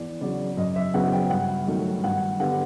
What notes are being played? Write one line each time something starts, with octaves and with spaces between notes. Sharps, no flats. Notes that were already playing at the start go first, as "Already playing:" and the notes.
Already playing: E2 D5
C#3 F#3 D5
F#2 D#5
E5
C#3 F#3 B3 F#5
G5
G2 F#5
D#3 F#3 A3
G2 F#5
D3 G3 B3 F#5